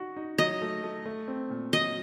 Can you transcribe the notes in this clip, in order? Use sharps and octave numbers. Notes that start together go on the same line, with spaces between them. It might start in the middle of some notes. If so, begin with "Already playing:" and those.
Already playing: D#4 F#4
D#4
F#3 D#5
A3
A3
A3
C4
A#2
F#3 D#5